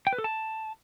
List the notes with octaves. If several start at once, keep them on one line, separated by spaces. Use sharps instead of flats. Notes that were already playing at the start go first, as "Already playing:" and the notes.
G5
B4
A4
A5